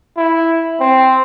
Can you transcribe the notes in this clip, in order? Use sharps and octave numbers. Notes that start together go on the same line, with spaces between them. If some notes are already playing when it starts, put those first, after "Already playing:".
E4
C4